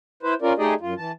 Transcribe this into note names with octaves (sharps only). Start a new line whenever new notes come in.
E4 B4 C5
C#4 F4 A#4 D5
A3 D#4 G4 G#4 D5 D#5
F#2 F4
E3 A5